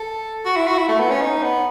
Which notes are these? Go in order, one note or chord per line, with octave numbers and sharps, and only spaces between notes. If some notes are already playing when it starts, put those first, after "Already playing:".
Already playing: A4
F#4
E4
F#4
E4
A3
B3
C#4
D#4
B3